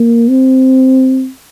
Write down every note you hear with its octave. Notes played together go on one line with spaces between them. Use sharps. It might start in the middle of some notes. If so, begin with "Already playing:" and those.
Already playing: A#3
C4